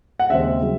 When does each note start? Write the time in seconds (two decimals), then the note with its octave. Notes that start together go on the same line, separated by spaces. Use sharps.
0.20 F#5
0.30 D#2 C#3 G#3 C4 E5
0.61 C#3 F#3